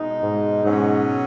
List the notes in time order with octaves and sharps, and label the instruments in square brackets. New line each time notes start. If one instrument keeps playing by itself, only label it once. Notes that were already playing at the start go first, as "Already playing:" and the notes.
Already playing: [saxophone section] B2 G#3 D#4
[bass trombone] G#2
[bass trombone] G#2 [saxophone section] B2 F#3 C#4